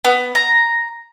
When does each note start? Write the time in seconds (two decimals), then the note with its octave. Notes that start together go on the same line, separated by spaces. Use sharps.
0.05 B3
0.35 A#5